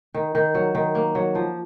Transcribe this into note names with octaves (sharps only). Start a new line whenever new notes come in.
D#3
D#3
F#3
D#3
A#3
F#3
F3